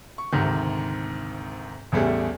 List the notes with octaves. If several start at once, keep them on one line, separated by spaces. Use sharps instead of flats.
C#6
D2 G#2 C3 D#3
A1 E2 G3 A3 G#4